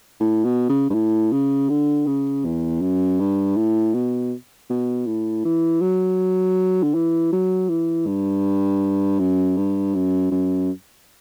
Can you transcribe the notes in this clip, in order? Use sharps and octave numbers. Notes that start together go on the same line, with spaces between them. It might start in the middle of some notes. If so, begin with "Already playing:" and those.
A2
B2
C#3
G2
A2
C#3
D3
C#3
E2
F#2
G2
A2
B2
B2
A2
E3
F#3
D3
E3
F#3
E3
G2
F#2
G2
F#2
F#2